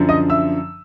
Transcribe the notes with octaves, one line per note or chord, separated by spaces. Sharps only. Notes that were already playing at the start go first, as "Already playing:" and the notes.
Already playing: F#2 D3 F3
D#5 D#6
E5 E6